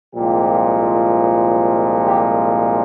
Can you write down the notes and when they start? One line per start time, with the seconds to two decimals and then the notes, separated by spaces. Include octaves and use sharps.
0.14 C2 A#2 F3 G#3 G4
2.04 G4